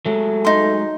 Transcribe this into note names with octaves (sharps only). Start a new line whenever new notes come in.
F#3 G#3 A3
D#4 C6